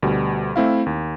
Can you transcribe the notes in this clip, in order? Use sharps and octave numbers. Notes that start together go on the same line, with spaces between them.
D2 B2 G3
A3 C4 E4 F5
D#2